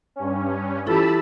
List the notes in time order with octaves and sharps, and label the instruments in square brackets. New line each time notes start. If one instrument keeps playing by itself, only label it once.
[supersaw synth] G2 C#4
[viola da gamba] E3 G4 [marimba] E4 F4 A4 [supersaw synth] A5 B5 E6